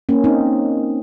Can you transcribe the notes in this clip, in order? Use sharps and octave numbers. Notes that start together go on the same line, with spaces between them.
A#3 C#4
C4 D#4